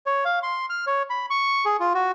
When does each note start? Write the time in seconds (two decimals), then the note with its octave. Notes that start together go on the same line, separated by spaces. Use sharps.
0.06 C#5
0.25 F5
0.43 C6
0.70 F6
0.87 C#5
1.10 B5
1.30 C#6
1.65 G#4
1.80 F4
1.95 F#4